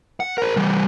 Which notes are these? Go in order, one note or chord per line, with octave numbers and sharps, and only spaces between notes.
F#5
A#4 C5
E3 G3